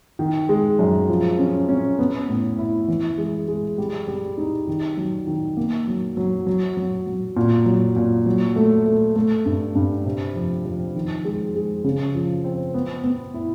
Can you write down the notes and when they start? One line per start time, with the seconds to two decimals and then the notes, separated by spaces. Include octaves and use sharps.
0.19 D#3
0.49 G#3
0.79 F#2
1.09 F3
1.39 C#4
1.69 C#4
1.99 B3
2.29 A2
2.58 E4
2.88 E3
3.18 G#3
3.48 G#3
3.78 G3
4.08 G3
4.38 D#4
4.67 D#3
4.97 F#3
5.27 D#3
5.57 A#3
5.87 F#3
6.17 F#3
6.47 F#3
6.77 F#3
7.07 F#3
7.37 A#2
7.66 F#3
7.96 A#2
8.26 F#3
8.56 A3
8.86 A3
9.16 A3
9.46 G2
9.75 G2
10.06 C3
10.35 F2
10.65 F2
10.95 D#3
11.25 G#3
11.55 G#3
11.84 C#3
12.15 F3
12.44 C4
12.74 B3
13.04 B3
13.34 E4